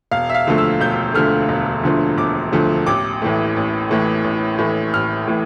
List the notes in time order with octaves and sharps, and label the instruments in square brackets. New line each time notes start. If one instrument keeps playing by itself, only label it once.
[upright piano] E1 F5
E5
F5
D2 D3 F3 A3
E6
E1 G6
D2 D3 F3 A3 F6
E1
D2 D3 F3 A3
E1 D6
D2 D3 F3 A3
A1 D6
A2 E3 A3
A1
A2 E3 A3
A1
A2 E3 A3
A1 F6
A2 E3